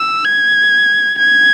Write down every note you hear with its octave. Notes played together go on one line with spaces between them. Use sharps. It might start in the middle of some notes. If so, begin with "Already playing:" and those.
Already playing: E6
G#6
G#6